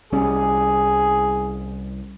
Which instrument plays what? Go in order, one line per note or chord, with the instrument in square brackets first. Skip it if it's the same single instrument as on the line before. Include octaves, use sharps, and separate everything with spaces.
[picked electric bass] C2 G3 C#4 [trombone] G#4